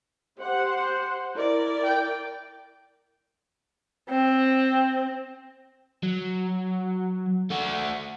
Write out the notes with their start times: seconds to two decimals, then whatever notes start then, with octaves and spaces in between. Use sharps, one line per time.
0.40 G4 C5 F#5
1.35 E4 A#4 D5
1.83 G5
4.10 C4
6.03 F#3
7.50 A3 F#4